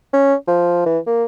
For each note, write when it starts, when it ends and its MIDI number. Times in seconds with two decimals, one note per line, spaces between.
0.13 0.34 61
0.47 0.82 53
0.86 0.99 52
1.06 1.25 58